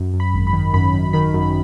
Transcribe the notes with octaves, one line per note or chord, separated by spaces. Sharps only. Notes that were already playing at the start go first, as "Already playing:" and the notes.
Already playing: F#2
F#2
B5
G#1
B5
D#3
F#2 B5
F#2
D#3 B5
F#2